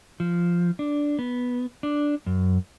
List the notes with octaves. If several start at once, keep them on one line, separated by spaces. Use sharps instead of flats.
F3
D4
B3
D4
F#2